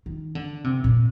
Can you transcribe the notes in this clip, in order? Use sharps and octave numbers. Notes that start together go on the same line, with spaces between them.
D#3
D3
C3
A#2